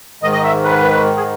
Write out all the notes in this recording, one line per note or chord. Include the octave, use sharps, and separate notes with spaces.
G#2 D#3 D#5
D#5
E5
B4
G#4